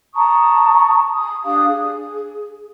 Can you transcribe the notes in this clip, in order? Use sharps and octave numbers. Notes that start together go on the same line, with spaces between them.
A5 A#5 C#6 D#6
G#5 D#6
D4 G4 F5 D#6
G#4